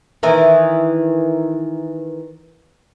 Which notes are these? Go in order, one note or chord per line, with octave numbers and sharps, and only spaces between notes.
D#3 E3